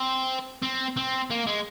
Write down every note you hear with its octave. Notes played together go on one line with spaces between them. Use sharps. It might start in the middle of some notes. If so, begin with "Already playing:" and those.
Already playing: C4
C4
C4
A#3
G#3